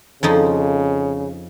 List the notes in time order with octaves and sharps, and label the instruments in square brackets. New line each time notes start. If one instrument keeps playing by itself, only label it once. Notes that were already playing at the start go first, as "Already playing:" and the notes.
[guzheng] F2 F3 D#4 [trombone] C#3